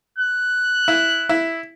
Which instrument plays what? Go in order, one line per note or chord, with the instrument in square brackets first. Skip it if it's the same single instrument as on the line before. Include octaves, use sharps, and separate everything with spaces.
[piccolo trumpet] F#6
[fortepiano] E4
E4